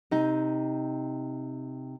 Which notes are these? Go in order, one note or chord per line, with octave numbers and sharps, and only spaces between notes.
C3 D#4